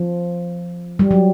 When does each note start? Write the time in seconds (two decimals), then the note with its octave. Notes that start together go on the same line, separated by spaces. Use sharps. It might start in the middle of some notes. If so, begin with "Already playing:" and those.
Already playing: F3
0.99 G3
1.11 F#3